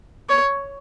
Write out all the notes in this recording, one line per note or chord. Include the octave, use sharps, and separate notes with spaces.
C#5